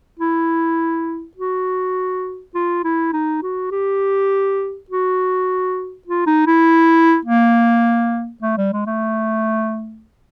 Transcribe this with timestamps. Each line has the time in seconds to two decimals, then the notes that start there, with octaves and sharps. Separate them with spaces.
0.19 E4
1.37 F#4
2.55 F4
2.84 E4
3.13 D#4
3.43 F#4
3.72 G4
4.90 F#4
6.08 F4
6.27 D#4
6.47 E4
7.25 A#3
8.42 A3
8.58 G3
8.73 G#3
8.87 A3